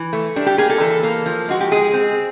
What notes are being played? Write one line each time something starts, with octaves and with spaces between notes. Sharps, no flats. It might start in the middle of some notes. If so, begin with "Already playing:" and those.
Already playing: E3
A3
G3 D4
G4
A#3 G#4
A4
E3 A4
A#3
F3
G#3 F#4
G4
G#3 G#4
C4